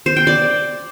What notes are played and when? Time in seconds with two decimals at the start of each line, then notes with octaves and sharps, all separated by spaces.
0.06 C5
0.17 G5
0.27 D5